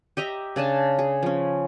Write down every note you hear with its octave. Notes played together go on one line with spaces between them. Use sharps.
G4 D#5 E5 A#5
C#3 D4 G#5 A5
G#4
F3 C#4